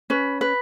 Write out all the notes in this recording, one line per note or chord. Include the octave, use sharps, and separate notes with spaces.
C#4 B4
B4